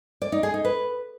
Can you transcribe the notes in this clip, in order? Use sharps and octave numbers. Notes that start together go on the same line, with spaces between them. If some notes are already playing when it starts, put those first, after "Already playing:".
D5
D#4
G#4
D#4
B4